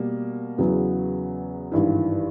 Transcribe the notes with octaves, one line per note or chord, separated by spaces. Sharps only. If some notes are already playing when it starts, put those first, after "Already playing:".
Already playing: B2 G3 A#3
E2 C#3 F#3 B3
G#1 G2 E3